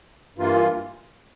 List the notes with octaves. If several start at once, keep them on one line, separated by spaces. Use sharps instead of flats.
G2 E3 A#3 F4